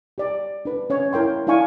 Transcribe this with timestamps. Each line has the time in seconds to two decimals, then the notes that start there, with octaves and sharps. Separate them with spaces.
0.18 G4 D5
0.65 D4 B4
0.90 C#4 C#5
1.13 E4 A#4 G5 C6
1.47 D4 E4 D5 F5 G#5 C#6